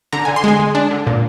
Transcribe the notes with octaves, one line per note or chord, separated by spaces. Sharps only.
D3 A#5
G#5
D3
C6
G#3 G#5
G#3
D4
D3
A#2